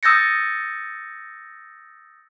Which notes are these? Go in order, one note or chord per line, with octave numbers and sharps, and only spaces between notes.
D#6 E6 G6 A6 A#6 C#7